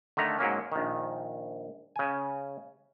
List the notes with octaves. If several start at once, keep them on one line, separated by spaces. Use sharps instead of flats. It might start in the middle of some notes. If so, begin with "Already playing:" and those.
D3 D#3 A3 A#5
G#2 F#3 A#3 C#4
A#1 D#3
C#3 G#5